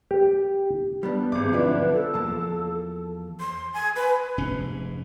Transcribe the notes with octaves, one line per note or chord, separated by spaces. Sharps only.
G4
G3 B3 D4
G#1 G2 G#3 D6
B1 D3 F3 C#4 D4 E4 B4
A4
E2 F3 A#3 A5
C6
G#5
B4
F1 G#2 C#4